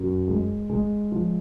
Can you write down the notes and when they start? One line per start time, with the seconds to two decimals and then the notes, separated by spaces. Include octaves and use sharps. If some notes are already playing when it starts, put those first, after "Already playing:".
Already playing: F#2
0.28 G#3
0.70 G#3
1.12 F3